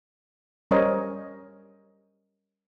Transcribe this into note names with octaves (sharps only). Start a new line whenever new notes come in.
G3 C#4 A#4 C5 C#5 D#5